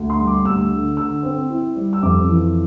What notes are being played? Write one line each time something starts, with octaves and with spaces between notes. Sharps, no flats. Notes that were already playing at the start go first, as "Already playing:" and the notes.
Already playing: D2
C6
G3
D6
D2 E6
D3
D3 E6
C4
E4
G3
E6
F2 D6
E3